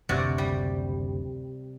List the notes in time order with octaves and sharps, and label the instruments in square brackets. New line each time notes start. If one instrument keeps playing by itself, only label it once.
[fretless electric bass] F#1 D2 [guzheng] C3 F#4 D5
[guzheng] G3